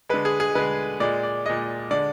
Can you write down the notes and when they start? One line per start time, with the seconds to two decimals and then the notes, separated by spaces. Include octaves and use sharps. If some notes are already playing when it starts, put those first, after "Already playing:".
0.09 D3 G#3 B4
0.25 G#4
0.40 G#4
0.55 D3 G#3 B4
1.00 A#2 G#3 D5
1.23 D5
1.46 A#2 G#3 D#5
1.91 D3 G#3 D5